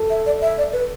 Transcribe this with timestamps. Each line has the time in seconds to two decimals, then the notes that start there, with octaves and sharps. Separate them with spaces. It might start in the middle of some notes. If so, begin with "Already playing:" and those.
Already playing: A4
0.10 E5
0.26 D5
0.41 E5
0.58 D5
0.73 B4